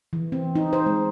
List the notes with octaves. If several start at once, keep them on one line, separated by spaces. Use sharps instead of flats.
E3
C4
D#4
C5
G#3